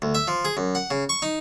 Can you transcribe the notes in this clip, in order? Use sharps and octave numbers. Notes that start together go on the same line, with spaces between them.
D2
E5
F3
G#4
F#2
F#5
C#3
C#6
D#4